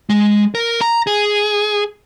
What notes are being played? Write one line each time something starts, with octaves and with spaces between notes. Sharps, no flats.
G#3
A#4
A#5
G#4